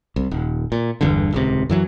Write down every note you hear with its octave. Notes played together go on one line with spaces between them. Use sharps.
C2
D#1
A#2
G1 E2 G2 D3
D#1 C#2 C3
F#2 E3 F#3